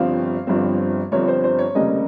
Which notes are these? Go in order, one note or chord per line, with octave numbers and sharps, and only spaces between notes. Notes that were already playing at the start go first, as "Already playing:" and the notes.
Already playing: G1 G2 F3 C4 F5
G1 G2 F3 C4
G1 G2 F3 C4 C#5
C5
C5
C#5
F1 D#2 C#3 G3 D#5